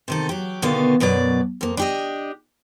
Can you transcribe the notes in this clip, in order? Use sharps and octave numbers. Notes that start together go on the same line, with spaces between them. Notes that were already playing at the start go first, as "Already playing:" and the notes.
C3 D#3 A4
F#3 G4
B2 D3 D#3 B3 F5
F#2 B2 F#3 D5
F2 A#3
D4 G4 D#5